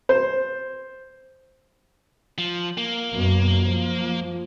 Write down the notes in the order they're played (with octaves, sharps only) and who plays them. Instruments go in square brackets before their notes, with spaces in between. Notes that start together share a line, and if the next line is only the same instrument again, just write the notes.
[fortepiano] C5
[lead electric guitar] F3
A#3
[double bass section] F#2 B2
F3